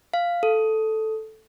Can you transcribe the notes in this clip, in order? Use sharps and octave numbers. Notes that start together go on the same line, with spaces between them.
F5
A4